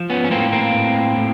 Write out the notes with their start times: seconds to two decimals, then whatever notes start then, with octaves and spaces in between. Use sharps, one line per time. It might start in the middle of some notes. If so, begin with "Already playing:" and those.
Already playing: F3
0.10 B3 C#4
0.24 C#4
0.30 A2 A#3 C4
0.53 A#3 C4
0.74 A2
1.16 A2